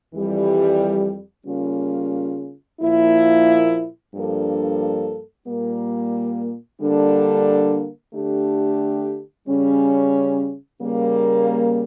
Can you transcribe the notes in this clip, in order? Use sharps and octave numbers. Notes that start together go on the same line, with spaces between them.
F2 E3 G3
C#3 G3 A#3 C#4 F4
A#2 F3 A#3 E4
G2 F3 A#3 D4 A4
A#2 G3 A#3
D3 G3 A#3 D4 A4
D3 A3 D4 G4
C#3 G3 C#4
C#3 G3 A#3